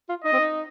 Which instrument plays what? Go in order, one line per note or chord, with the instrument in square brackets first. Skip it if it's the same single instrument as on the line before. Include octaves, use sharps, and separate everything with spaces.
[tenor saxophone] F4
[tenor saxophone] D#4 [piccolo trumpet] D#5
[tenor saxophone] C4
D#4